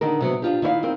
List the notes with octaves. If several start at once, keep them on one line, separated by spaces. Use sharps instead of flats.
D3 D#3 A#4
C3 F#3 B3
D4 F4 G4
D#3 E4 C#5 F5
C4 D#4 A#4